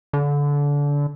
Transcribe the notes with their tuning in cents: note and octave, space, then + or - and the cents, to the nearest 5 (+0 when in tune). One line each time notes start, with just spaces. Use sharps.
D3 -25